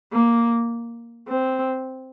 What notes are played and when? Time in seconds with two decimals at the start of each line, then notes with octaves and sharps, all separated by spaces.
0.12 A#3
1.28 C4